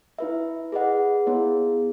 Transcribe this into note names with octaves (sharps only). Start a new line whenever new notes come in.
E4 B4 E5
G#4 B4 D#5 F#5
B3 E4 G#4 C#5